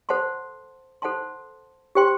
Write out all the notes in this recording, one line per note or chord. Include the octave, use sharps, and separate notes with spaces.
A4 C5 F#5 A5 C6
A4 C5 F#5 A5 C6
G4 C5 G5 C6